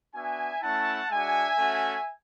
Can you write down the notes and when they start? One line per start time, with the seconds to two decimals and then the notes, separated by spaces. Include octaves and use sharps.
0.14 B3 D4 F#4 E5 G#5
0.62 A3 C#4 E4 F#5 A5
1.10 G#3 D4 F#4 E5 G#5
1.58 A3 C#4 F#4